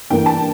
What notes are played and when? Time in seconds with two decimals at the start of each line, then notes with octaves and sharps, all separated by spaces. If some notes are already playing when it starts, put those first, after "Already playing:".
0.10 G2 E3 A#3 G5
0.26 A5